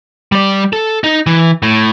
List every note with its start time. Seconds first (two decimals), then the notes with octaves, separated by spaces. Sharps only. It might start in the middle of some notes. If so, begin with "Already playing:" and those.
0.32 G3 D5
0.73 A4
1.04 D#4
1.27 E3
1.63 A2